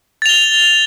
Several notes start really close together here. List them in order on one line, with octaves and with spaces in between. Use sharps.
A6 F7 G7